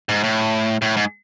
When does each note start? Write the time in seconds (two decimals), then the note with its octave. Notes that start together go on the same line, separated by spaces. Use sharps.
0.09 G#2
0.24 A2
0.82 A2
0.97 G#2